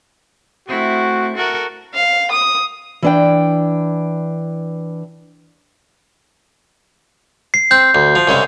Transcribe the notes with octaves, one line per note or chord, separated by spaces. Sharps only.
A3 C4 E4 F#4
F#4 A4 A#4
F5
D#6
E3 D4 G5
C7
C4 G6
D2
F3
C2 C#3 G#3